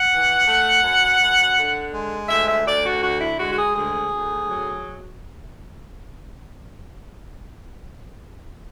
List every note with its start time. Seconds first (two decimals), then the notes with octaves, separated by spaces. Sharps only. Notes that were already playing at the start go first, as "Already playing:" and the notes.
Already playing: F#5
0.10 E3
0.47 A3
0.83 F#2
1.20 F#2
1.56 D3
1.93 G#3
2.29 D2 E5
2.47 E5
2.66 D2 D5
2.84 F#4
3.02 D3 F#4
3.20 E4
3.39 G#3 F#4
3.52 F#4
3.57 G#4
3.75 D2 G#4
4.12 D2
4.48 F#3